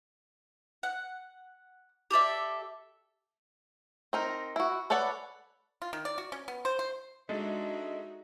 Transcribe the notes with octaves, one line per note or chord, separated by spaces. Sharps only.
F#5
G4 A4 D5 E5
C4 D#4 A#4
E4 F#4
A4 B4 C#5 D5 F#5
F4
D#3
D5
F#4
C#4
B3
C5
C5
G#3 D4 D#4 F#4 A4 E5